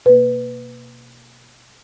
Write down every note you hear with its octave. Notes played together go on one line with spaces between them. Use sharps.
B2 A#3 B4